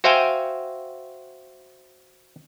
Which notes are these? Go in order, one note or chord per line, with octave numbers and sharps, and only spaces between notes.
F#4 C5 E5 F5 G5 G#5